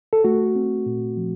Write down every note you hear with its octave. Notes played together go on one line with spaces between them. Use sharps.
A4
A3 F#4
C4
A#2
F3